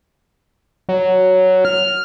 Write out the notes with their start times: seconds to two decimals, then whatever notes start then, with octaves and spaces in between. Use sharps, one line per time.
0.89 F#3
1.65 F6